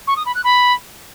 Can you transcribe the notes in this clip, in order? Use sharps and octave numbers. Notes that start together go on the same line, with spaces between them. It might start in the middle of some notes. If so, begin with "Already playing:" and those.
C#6
D#6
B5
F#6
B5